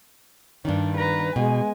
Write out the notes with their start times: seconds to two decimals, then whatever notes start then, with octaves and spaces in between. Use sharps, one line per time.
0.65 G2 D#3 D4
0.97 B4 A#5
1.36 B2 G#3 G#5